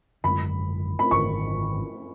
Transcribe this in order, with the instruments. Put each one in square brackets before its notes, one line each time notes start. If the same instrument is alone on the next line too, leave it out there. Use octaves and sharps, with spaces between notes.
[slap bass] G#1 F#2 D3 G#3 [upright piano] B5
[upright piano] B5
[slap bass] G#1 F#2 D3 [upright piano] C#6